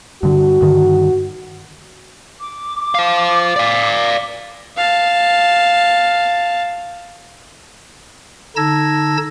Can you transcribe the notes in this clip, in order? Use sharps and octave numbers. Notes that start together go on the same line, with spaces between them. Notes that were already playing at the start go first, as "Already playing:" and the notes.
G2 D3 F#4
G2 D3 D#3
D6
C5 F5
D5 F5
F5 A5
D3 D#4 A5 E6 G#6 A#6